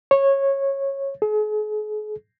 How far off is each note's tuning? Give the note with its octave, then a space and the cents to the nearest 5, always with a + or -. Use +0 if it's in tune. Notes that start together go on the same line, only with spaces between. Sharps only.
C#5 -15
G#4 +40